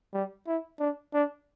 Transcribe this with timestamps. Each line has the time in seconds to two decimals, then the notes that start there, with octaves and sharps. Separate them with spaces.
0.14 G3
0.47 E4
0.80 D4
1.14 D4